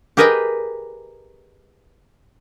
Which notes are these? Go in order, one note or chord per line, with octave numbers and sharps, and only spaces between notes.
G4 G#4 A#4 B4 D#5 G5